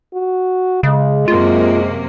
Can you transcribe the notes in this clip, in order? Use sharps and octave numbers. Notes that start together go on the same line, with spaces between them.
F#4
C#3 G#3
F#2 C3 A#3 F4